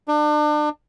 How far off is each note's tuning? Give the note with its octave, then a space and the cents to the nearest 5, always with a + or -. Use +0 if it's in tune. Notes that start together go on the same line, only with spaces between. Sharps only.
D4 +35